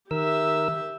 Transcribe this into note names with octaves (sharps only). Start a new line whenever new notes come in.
D#3 G4 A#4 E5 E6